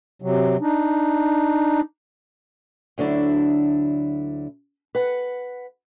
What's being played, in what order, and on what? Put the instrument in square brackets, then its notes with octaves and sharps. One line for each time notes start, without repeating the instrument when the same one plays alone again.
[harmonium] C3 F#3
D4 D#4
[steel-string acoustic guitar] D2 D3 F#3 D4 E4
B4 F#5